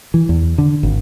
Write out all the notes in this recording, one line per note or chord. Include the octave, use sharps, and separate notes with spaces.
E3
E2
D3
G#1